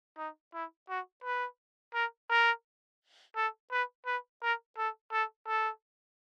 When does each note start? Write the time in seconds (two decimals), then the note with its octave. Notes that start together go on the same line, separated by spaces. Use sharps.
0.18 D#4
0.54 E4
0.89 F#4
1.24 B4
1.94 A#4
2.30 A#4
3.36 A4
3.72 B4
4.06 B4
4.42 A#4
4.78 A4
5.12 A4
5.47 A4